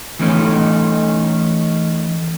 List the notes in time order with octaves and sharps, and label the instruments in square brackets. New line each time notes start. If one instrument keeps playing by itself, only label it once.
[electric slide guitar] E3 A3 C#4 D#4